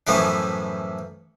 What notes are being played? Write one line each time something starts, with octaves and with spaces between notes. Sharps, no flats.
F#2 A2 E3 F3 B3 C#4